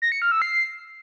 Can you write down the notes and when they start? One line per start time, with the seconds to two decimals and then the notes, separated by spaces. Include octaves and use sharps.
0.02 A#6
0.12 C#7
0.22 F6
0.32 E6
0.42 C7